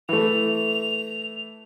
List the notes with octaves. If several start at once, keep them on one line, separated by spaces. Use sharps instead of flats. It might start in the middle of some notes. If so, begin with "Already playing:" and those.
E3 A3 F7